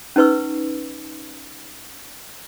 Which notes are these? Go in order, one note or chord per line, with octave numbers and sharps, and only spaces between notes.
C#4 D#4 B4 C#6 E6